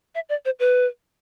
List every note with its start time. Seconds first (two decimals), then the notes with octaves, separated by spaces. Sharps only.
0.15 E5
0.29 D5
0.45 C5
0.59 B4